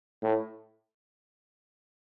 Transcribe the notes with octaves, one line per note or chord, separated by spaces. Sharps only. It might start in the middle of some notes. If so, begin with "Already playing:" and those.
A2